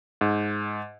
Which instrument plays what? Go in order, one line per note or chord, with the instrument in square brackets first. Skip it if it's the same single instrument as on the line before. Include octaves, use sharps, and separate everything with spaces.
[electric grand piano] G#2